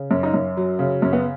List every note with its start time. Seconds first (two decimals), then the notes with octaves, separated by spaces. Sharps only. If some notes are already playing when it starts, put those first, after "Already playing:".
Already playing: C#3
0.11 F#2 C#4
0.23 D#4
0.34 F#2 C#4
0.57 F#3
0.79 C#3
1.02 F#2 C#4
1.13 B3